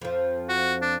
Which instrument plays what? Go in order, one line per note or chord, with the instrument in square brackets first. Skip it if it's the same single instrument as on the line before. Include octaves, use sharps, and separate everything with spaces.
[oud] F2 F3
[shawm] F#4
D4